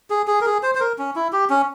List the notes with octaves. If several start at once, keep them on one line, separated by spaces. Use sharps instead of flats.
G#4
G#4
A#4
G#4
C5
C5
A#4
C#4
E4
G4
C#4